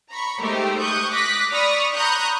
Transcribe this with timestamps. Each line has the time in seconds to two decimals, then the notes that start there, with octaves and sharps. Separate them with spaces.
0.10 A#5 B5 C#6
0.40 G#3 A3 D#4 G4 A#4 C5
0.80 C#6 D#6 F#6 G6
1.11 D6 D#6 F#6 A#6 B6
1.52 D5 B5 C#6 D#6 F6
1.93 A#5 B5 C#6 D#6 F#6 G6